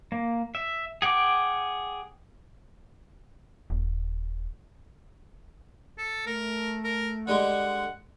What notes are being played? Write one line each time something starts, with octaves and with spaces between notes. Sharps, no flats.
A#3
E5
G#4 F#5 G5 D6
D#1
A4
A3 A#4
A#4
D3 G3 G#3 F#5